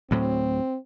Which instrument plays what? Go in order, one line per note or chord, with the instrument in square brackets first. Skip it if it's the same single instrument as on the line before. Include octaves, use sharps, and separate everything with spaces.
[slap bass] D2 A2 F#3 [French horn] C4